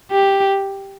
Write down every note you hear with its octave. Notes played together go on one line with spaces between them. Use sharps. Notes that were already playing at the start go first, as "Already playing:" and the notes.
G4